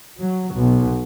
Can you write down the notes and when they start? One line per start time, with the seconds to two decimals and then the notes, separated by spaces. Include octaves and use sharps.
0.20 F#3
0.53 B1